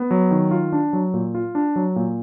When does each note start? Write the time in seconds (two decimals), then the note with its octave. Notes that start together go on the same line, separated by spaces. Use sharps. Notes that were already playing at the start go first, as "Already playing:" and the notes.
Already playing: B3
0.11 F#3
0.31 D#3
0.51 F4
0.73 D4
0.93 F#3
1.14 A#2
1.35 F4
1.55 D4
1.76 F#3
1.96 A#2